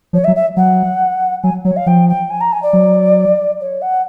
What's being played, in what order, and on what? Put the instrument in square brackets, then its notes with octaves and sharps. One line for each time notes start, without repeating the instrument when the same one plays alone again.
[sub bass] F3 [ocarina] C#5
[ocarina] E5
[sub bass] F#3
[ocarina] E5
[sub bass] F#3 [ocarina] F#5
[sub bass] F#3 [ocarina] G#5
[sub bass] F#3 [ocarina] C#5
[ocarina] F5
[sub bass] F3 [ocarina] G5
[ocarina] G5
G#5
A#5
G#5
D5
[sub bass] F#3
[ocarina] C#5
F#5